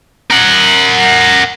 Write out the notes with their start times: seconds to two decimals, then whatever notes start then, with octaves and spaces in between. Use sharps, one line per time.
0.30 A#4 F#5